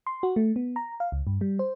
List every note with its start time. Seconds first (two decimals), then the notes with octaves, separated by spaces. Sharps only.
0.07 C6
0.23 F#4
0.36 A3
0.56 B3
0.76 A#5
1.00 F5
1.12 C#2
1.27 G2
1.41 G3
1.59 C5